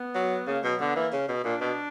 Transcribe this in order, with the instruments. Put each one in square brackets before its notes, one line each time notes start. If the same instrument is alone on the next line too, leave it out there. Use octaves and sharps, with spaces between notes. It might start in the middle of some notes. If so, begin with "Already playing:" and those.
Already playing: [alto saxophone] B3
[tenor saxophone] F#3
[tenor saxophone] C#3 [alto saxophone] A#3
[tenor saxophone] B2 [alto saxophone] F#3
[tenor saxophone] D3 [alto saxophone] B3
[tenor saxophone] E3 [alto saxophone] A#3
[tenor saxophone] C#3
B2
[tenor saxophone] A#2 [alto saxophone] D4
[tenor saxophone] B2 [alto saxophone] D4